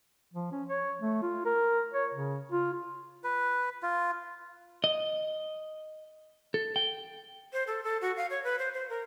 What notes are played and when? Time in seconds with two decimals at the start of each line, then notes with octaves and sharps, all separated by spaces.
0.34 F3
0.52 C#4
0.69 C#5
1.02 A3
1.22 F4
1.46 A#4
1.94 C#5
2.14 C#3
2.52 F4
3.24 B4
3.83 F4
4.84 D#5
6.54 A4
6.76 G5
7.53 C5
7.67 A4
7.84 A4
8.01 F#4
8.17 F5
8.30 C#5
8.44 B4
8.59 C5
8.74 C5
8.90 A#4